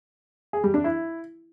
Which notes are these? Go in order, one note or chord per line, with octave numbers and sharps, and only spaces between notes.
G#4
G3
D4
E4